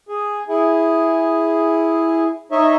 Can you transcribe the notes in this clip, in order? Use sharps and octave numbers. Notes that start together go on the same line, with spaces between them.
G#4
E4 G#4
D#4 C#5 D#5 E5